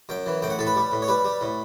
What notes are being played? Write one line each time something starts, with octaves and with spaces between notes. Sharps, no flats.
F#2 G5
E3
A2 G5
F#5
A2 A4
B4
G3
A2
C#5
G3 B4
G3
A2